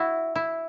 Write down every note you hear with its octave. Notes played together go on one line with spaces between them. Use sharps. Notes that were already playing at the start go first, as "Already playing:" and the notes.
Already playing: E4 F#4
E4